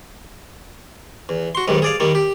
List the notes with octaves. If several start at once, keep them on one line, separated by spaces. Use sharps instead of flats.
E2
F#4 C6
B1 G#2 D#3 G3
G#4 D5 F5
D#3 G3 A#3
G4